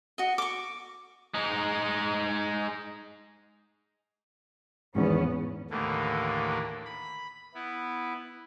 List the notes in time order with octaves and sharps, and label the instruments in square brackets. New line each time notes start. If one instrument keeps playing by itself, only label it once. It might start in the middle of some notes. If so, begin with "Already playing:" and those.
[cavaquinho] F#4 D#5
C#6 D6
[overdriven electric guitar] G#3 D#4
[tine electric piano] G#1 E2 [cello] G#2 [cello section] B3 C#4
[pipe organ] D#2 A2 D3 E3 A3 A#3
B5
B3 E4